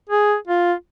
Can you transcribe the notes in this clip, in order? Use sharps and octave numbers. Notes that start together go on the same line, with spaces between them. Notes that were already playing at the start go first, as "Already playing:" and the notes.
G#4
F4